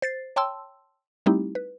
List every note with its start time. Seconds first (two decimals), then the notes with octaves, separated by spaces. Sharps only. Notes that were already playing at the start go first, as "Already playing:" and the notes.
0.02 C5 A6 C7
0.36 C#5 G5 A5 C6 E6
1.26 G3 A3 C4 D#4 E4 G4
1.55 B4